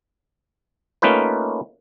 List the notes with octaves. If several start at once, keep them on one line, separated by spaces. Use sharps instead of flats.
A3 A#3 C#4 D#4 F4 B4